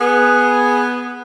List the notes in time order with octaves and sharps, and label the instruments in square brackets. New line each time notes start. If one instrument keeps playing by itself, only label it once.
[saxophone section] B3 [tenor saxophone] G#4